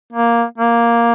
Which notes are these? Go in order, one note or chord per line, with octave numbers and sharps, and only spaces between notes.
A#3
A#3